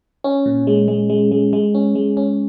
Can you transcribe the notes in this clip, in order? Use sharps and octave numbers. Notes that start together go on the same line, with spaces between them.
C#4
A#2
G#3
G#3
G#3
G#3
G#3
C#4
G#3
C#4